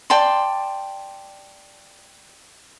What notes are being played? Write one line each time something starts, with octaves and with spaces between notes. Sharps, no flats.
D5 G5 A5 C6